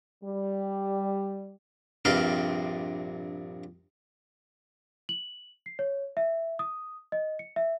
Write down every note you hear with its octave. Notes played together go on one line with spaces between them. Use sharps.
G3
A#1 G2 C3 B4 F5 G5
F#7
C7
C#5
E5
D#6
D#5
C#7
E5